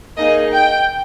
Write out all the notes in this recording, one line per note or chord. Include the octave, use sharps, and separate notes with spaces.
A#3 D#4 G#4 D#5
G5